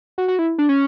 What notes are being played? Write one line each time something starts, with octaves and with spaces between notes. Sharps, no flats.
F#4
F#4
E4
D4
C#4